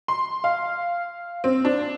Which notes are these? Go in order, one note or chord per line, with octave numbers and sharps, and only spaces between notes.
C6
F5
C4
D4